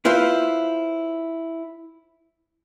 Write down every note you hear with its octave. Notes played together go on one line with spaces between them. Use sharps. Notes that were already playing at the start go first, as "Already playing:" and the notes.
E4 F4 B4 C5